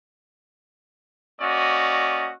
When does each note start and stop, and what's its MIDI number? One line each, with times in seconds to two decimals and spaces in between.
1.40 2.32 58
1.40 2.32 61
1.40 2.32 66
1.40 2.32 74
1.40 2.32 75